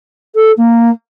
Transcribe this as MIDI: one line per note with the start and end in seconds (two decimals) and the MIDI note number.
0.34 0.51 69
0.57 0.89 58